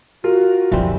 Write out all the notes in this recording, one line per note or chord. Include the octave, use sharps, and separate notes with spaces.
F4 F#4 A#4
F2 D3 E3 G3 C4